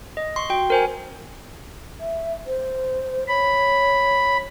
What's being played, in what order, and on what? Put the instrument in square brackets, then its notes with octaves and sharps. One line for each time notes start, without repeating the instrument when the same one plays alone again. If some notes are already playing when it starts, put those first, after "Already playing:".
[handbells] D#5
C6 C#6
F#4 G5
A#4 C5 G#5
[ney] E5
C5
[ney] C#5 [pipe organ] B5